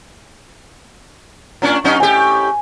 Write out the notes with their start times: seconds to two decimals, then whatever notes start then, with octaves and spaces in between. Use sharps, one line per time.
1.62 A2 C#4 D4
1.84 F#2 C#4 D#4
2.00 A2 G4 G#5